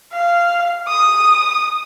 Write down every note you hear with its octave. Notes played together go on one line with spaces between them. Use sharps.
F5
D#6